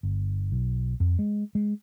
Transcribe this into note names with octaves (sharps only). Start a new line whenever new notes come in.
G1
B1
F2
G#3
G#3